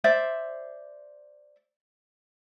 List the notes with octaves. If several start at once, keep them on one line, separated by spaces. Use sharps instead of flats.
C5 D5 E5